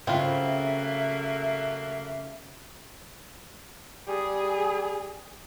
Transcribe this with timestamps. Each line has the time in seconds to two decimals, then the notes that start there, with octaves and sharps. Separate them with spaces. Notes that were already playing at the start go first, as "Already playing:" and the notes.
0.07 C#3 F#3 A3 A#3 C4 F4 E5
4.08 G3 G#4